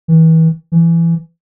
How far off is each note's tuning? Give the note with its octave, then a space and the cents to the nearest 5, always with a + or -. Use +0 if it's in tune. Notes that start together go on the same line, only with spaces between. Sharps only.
E3 -35
E3 +20